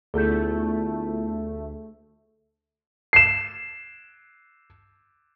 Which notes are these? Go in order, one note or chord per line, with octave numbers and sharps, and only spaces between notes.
D2 A3 B3 E4 F4 G#4 A4 G6
C7 E7